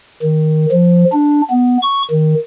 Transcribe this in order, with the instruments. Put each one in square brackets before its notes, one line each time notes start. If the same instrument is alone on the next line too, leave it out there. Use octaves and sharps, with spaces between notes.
[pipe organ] D#3
F3
D4
B3
C#6
D#3